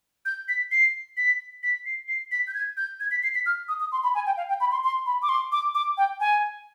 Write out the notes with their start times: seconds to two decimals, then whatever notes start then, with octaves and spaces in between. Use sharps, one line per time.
0.25 G6
0.48 B6
0.71 C7
1.17 B6
1.63 B6
1.85 C7
2.08 C7
2.31 B6
2.47 G6
2.54 G#6
2.77 G6
3.00 G#6
3.11 B6
3.23 C7
3.34 B6
3.46 F6
3.68 D#6
3.80 D#6
3.92 C6
4.03 B5
4.15 G#5
4.26 G5
4.37 F5
4.48 G5
4.60 B5
4.71 C6
4.84 C6
5.06 B5
5.22 D6
5.29 C6
5.52 D6
5.74 D6
5.97 G5
6.20 G#5